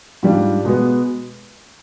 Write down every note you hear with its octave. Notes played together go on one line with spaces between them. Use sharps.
G#2 G3 D4 F4
B2 G#3 B3